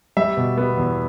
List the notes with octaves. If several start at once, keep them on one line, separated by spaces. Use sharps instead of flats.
G3 E5
B2
B3
E2